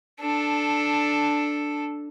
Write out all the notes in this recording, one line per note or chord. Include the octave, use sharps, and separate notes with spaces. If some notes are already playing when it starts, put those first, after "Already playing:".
D4 A4